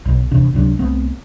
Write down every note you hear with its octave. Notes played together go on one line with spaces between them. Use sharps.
B1
F1 E2 C3 D4
C#2 C3 F#3 D4
C2 A3 B3 C4